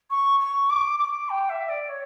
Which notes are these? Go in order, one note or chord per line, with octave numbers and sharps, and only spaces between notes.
C#6
C#6
D6
D6
G5
E5
D5
C#5